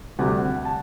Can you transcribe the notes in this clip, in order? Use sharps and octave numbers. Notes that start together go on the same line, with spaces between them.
D2 C3 G3 F#5
A5